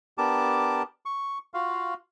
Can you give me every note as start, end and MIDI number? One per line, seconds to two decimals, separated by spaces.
0.18 0.83 59
0.18 0.83 62
0.18 0.83 67
0.18 0.83 70
0.18 0.83 81
0.18 0.83 86
1.06 1.38 85
1.54 1.94 65
1.54 1.94 66
1.54 1.94 77